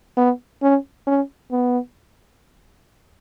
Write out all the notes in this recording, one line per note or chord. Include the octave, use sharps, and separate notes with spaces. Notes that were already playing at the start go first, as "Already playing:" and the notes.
B3
C#4
C#4
B3